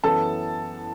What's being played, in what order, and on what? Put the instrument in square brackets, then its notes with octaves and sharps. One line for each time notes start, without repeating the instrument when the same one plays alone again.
[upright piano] F#2 E3 B3 E4 A4 A5